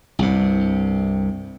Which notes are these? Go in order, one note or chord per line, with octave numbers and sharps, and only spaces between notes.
C2 G2 C3